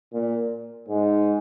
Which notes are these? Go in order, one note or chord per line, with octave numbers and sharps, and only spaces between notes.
A#2
G#2